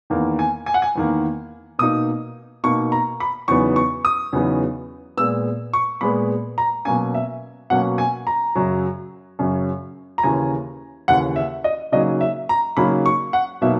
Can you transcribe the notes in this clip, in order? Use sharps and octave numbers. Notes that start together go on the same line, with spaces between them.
E2 D#3 A#3
G#5
G#5
F#5
G#5
E2 D#3 A#3
B2 A#3 D#4 D#6
B2 A#3 D#4 C#6
A#5
B5
E2 C#3 F#3 B3 D#4 C#6
C#6
D#6
E2 C#3 F#3 B3 D#4
A#2 G#3 B3 E6
C#6
A#2 G#3 B3 B5
A#5
B2 F#3 A#3 C#4 G#5
E5
B2 F#3 A#3 C#4 F#5
G#5
A#5
F#2 C#3 F#3
F#2 C#3 F#3
A#5
D#2 C#3 E3 G#5
D#2 C#3 E3 F#5
E5
D#5
C#3 F#3 A#3 D#4 D#5
E5
A#5
C#3 F#3 A#3 D#4 B5
C#6
F#5
B2 F#3 A#3 D#4 E5